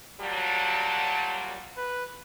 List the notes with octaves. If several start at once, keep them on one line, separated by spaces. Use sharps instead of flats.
A#2 F#3 G3 A5
B4